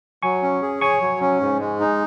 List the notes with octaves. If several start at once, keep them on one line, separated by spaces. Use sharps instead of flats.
F#3 G#5 C#6
C#4
G#4
C#5 G#5 C#6
F#3
C#4
G#2
G#3
D#4